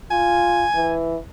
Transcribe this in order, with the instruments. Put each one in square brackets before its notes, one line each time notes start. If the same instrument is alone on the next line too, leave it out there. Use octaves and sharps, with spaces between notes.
[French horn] F4 [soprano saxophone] G#5
[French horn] E3